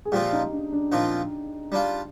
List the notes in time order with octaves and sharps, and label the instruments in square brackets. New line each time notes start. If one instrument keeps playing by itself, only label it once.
[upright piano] G#4
[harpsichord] A#2 F3 C4 F4 [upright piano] G4
[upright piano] D#4
D4
D4
[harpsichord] A#2 F3 C4 F4 [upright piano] D#4
[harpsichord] G3 D4 F4